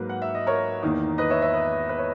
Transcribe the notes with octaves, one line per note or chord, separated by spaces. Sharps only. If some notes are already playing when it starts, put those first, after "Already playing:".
Already playing: G#2 F#3 A#3 A#4 B4
F#5
E5
D#5
A#4 C#5
E2 D#3 A#3 D#4
B4 D#5
C#5 E5
C#5 E5
B4 D#5
B4
C#5